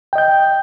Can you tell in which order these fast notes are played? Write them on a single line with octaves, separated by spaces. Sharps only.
G5 D#5 G6